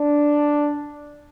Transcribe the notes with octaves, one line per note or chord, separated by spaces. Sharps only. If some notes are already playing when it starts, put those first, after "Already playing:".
Already playing: D4